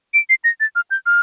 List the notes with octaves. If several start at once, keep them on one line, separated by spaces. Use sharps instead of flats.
D7
C7
A#6
A6
F6
G6
F6